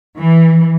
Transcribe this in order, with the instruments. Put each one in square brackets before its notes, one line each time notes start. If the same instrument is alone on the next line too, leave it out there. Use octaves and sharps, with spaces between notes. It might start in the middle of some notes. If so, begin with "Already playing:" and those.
[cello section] E3